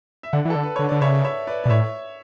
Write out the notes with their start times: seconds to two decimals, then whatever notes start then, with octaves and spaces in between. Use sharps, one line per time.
0.23 E5
0.33 D3 D5 F#5
0.45 E3 A4
0.55 D3
0.63 B4
0.76 D3 C#5
0.89 D3 D5
1.01 C#3 C#5 E5
1.24 C#5 E5
1.47 B4 D5
1.64 B2 D5
1.69 A2 C#5 E5